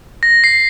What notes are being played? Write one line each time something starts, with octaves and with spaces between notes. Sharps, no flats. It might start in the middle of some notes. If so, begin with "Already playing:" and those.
A#6
C7